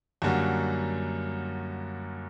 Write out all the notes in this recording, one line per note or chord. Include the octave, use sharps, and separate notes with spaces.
F#2 D3 G3 A#3 F#4